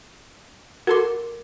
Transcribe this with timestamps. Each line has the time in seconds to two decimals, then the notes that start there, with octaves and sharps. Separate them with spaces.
0.87 F#4 A4 A#4 C6 D6